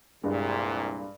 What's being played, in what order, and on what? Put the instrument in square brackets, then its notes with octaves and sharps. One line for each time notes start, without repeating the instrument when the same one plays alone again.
[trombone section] C2 A#2 [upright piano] G2 G#3